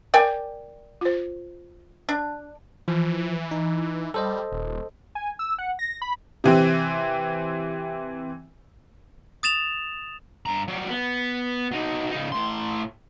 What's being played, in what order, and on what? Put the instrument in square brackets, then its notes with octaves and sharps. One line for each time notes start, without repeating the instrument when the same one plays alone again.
[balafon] A#4 [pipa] D5 G5 G#5
[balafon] F4 C5
[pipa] D4
[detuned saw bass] E3 [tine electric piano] F3
[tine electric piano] D#4
[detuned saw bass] G3 [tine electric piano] A4 C5 D#5
[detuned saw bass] D#1
[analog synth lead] G#5
E6
F#5
A#6
B5
[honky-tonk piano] C3 E3 C4
[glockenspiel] D#6 A6 E7 F7
[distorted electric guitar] G2 A#5
F#3 G3
B3
F#3 D#4
C#3 D#4
A2 C6